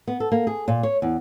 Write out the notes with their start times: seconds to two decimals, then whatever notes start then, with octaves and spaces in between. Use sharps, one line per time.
0.07 B3
0.20 A4
0.32 A#3
0.47 G#4
0.68 A#2
0.83 C#5
1.02 E2